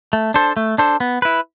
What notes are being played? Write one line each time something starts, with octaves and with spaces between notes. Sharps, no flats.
A3
D4 A4 C5
A3
D4 A4 C5
B3
E4 B4